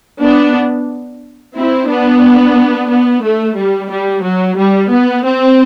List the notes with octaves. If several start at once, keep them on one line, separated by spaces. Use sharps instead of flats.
B3 D4
C4 E4
B3 D4
B3
A3
G3
G3
F#3
G3
B3
C4